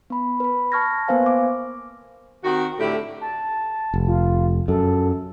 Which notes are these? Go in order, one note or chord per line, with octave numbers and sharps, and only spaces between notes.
B3 B5
B4 B5
A5 C#6 F6 G#6 A#6
A#3 B3 B4 C5 F5 G#5
D6
D#3 C4 F#4
A2 D3 G4 E5
A5
F1
F4
F#2 A4